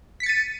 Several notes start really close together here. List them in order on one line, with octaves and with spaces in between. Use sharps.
B6 C#7 A6 D#7